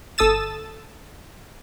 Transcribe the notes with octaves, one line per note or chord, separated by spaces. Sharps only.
G1 A4 D#6 E6 A6 E7